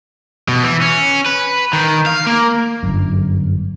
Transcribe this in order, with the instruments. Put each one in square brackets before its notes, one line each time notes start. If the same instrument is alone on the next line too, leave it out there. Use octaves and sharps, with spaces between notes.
[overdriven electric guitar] B2
E3
C#4
B4
D#3
F5
A#3
[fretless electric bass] G1 F#2